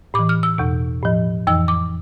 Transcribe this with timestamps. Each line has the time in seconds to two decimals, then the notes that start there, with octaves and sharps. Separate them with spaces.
0.14 A2 D6
0.19 E3
0.29 F6
0.43 E6
0.58 E2 B2
1.02 A2 F3
1.47 F2 E3 E6
1.68 D6